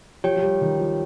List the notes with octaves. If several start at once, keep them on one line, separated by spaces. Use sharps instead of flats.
F3 G4 C#5 G5
F3
G3
D#3
F3